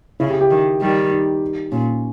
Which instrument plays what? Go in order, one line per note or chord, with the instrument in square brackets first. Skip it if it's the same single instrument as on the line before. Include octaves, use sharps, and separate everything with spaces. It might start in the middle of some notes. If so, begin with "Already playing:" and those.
[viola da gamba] C#3 [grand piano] E4
[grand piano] G4
G4
[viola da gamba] D#3
D#3 G3
[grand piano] D#4
[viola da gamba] A#2 [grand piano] C#4